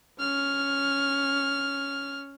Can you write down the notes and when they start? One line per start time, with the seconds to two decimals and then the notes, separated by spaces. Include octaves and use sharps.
0.19 C#4 F6